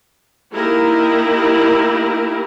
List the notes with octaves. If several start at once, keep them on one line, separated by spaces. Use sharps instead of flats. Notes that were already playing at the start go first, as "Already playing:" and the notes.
A#3 D#4 E4 G4 A#4